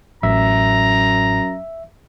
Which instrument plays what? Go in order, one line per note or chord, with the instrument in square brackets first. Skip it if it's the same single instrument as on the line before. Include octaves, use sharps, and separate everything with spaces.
[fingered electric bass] A1 [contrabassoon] F#2 [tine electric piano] E5 [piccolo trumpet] A#5